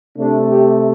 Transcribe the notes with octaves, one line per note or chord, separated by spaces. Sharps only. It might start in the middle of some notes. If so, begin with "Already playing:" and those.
C3 A3 D4
G4